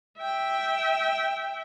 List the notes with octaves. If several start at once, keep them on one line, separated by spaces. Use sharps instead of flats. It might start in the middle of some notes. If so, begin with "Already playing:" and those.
E5 G5